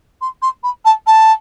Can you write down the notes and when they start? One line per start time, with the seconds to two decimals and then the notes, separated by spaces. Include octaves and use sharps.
0.21 C6
0.42 C6
0.63 B5
0.85 A5
1.07 A5